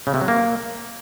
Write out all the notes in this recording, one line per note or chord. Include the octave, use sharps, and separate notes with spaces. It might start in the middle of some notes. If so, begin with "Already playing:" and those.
C#3
C3
F#3
A#3